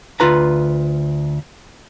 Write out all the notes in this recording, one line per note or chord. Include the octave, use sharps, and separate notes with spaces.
D2 F4 B4 A#5